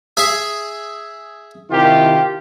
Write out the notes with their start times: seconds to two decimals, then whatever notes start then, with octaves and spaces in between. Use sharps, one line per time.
0.17 G#4 E5 G#5
1.71 C3 D#3 E4 F4 G4